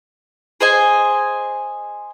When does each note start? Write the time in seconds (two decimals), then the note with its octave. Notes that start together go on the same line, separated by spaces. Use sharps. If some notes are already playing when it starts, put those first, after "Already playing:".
0.60 G#4 C5 D#5 G#5